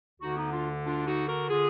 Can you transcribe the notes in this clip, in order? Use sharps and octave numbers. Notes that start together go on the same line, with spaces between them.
D2 D3 D#4 F#4
B3 D#4
D4 F4
D4 F4
D#4 F#4
F#4 A#4
D3 F4 G#4